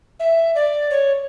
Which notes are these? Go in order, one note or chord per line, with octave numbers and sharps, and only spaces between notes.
E5
D5
C#5